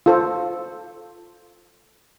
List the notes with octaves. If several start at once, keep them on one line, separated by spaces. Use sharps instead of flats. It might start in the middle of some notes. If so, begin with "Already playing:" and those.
F4 A4 C5